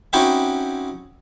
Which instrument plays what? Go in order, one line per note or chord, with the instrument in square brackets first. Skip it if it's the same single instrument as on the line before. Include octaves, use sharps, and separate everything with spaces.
[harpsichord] C4 C#4 D#4 E4 F#4 G4